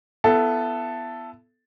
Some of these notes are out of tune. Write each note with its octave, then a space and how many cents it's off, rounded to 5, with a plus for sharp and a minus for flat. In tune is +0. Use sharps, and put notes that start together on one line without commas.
B3 +10 E4 +30 A4 +0